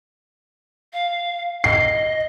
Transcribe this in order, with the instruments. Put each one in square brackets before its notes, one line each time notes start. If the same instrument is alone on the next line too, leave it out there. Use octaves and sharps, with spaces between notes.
[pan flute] F5
[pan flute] D#5 [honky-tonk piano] C7